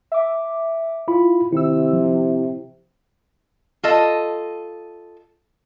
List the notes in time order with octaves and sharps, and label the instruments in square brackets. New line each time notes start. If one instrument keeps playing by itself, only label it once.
[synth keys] E5 D6
[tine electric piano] E4 F4 B5
[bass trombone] C3 [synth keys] D#3 E6 [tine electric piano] E4
[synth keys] F3
[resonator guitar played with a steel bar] F4 A4 D#5